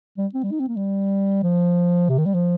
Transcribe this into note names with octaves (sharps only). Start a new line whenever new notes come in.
G3
C4
G3
D#4
C4
A#3
G3
F3
C3
D#3
G3
F3